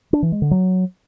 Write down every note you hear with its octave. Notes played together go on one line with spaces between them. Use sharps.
D4
E3
G#3
D3
F#3